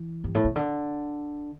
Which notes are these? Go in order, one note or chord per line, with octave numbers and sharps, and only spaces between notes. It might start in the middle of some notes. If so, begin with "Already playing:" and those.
Already playing: E3
G2
A2
C3
D3